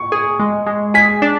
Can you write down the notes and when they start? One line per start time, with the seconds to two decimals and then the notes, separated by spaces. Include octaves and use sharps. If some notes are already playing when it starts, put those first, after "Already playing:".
Already playing: C#6
0.12 G#4
0.40 G#3
0.66 G#3
0.94 G#4 B6
1.22 D4